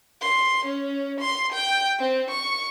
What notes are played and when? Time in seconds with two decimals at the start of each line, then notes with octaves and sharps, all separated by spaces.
0.22 C6
0.65 C#4
1.20 C6
1.53 G5
2.00 C4
2.30 C#6